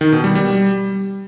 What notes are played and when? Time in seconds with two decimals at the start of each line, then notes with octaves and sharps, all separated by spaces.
0.01 D#3
0.12 B2
0.24 G3
0.35 G3